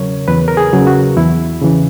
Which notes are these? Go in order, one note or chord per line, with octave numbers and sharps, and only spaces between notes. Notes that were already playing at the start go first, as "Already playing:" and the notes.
Already playing: E2 C#3 F#3 A#4 C#5
E2 B4
A#4
G#4
C#3 F#3
F#4
E2 E4
C#3 E3